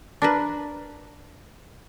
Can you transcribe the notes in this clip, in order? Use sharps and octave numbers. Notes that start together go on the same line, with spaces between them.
D4 A#4 B4